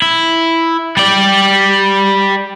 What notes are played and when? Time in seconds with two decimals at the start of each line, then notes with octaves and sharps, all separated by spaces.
0.02 E4
0.97 G3 D5